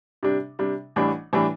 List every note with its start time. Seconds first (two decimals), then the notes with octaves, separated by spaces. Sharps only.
0.23 C3 G3 D4
0.59 C3 G3 D4
0.96 A1 A2 E3 G3 D4
1.33 A2 E3 G3 D4